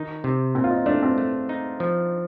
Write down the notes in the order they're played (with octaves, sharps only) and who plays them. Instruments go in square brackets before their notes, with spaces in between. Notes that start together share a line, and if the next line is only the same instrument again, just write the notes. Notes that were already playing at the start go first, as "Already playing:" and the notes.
Already playing: [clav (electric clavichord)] D#3 D#4
C3
[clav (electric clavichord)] A#2 [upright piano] C4
[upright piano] F4
D#4
[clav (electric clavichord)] A3 [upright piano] D4
[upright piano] C4
[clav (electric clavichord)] A3
D#4
F3